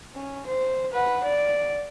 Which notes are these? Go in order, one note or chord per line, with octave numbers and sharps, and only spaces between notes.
C#4
C5
B4 F#5
D5